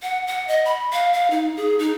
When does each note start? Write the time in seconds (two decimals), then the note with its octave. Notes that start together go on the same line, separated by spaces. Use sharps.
0.02 F#5
0.27 F#5
0.48 D#5
0.65 B5
0.93 F5
1.13 F5
1.30 D#4
1.57 G#4
1.79 D#4